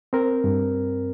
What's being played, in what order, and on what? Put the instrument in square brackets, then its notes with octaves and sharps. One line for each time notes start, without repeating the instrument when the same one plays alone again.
[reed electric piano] C4 A#4
G2